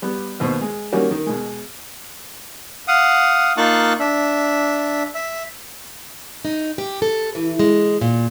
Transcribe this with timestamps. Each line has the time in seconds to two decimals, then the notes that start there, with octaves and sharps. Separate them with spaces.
0.02 G3 B3
0.40 D#2 B2 B4 C5 C#6
0.61 G#3
0.92 D#3 G3 A#3 C#4 F#4
1.11 D#3
1.26 B2 G#3
2.88 F5 F#5 D#6
3.57 A#3 D#4 F4 A5 C#6 F#6
4.00 D4 E5
5.15 E5
6.45 D#4
6.78 G4
7.02 A4
7.35 E3
7.59 G#3
8.01 A#2